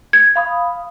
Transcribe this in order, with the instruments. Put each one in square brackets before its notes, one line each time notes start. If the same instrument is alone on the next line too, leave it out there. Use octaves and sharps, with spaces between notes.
[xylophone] G#6
[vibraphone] F5 B5 D#6